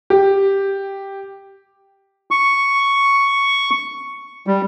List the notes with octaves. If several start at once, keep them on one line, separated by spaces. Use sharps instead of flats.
G4
C#6
G3